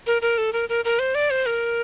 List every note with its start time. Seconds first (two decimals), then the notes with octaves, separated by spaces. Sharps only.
0.07 A#4
0.22 A#4
0.38 A4
0.53 A#4
0.69 A#4
0.85 A#4
0.99 C5
1.15 D5
1.30 C5
1.46 A#4